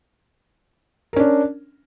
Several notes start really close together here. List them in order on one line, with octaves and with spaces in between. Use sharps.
A#4 C#4 D4